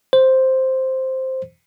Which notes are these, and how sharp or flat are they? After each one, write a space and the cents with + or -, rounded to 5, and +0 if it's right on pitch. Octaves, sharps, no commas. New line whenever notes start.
C5 +0